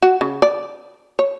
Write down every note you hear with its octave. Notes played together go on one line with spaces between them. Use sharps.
F#4
C#3
D5
C#5